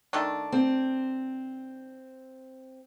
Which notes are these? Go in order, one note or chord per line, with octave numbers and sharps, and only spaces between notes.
D#3 A3 D4
C4